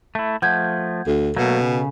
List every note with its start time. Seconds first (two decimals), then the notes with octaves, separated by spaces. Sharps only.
0.15 A3 E4
0.42 F3 A3 F#5 G6 G#6
1.07 D2 A4
1.37 B2 F#3 A3 A#3
1.61 C#3